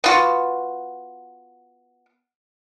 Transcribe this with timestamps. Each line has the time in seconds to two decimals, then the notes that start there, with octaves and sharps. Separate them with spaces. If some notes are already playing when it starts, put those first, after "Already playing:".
0.04 B3 F4 F#4